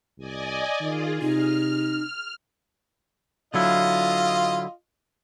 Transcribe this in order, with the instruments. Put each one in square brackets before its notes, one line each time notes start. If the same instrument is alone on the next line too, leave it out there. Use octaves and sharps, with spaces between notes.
[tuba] C2 [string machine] D5 D#5 G#5
[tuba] D#3 [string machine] F4 G#4
[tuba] C3 [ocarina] D#4 [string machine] F6
[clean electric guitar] D3 F#3 E4 [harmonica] F4 D#5 F5